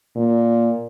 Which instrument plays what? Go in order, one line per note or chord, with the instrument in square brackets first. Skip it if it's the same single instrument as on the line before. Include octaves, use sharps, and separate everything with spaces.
[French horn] A#2